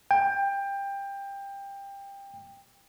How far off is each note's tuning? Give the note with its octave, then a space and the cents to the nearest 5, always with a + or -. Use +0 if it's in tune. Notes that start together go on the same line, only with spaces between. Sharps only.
G5 +20